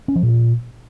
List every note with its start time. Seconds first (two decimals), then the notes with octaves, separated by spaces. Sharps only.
0.08 C#4
0.16 F3
0.23 A#2